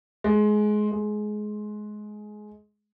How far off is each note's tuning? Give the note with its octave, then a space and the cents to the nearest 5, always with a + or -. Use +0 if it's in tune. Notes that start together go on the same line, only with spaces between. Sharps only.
G#3 +20
G#3 +20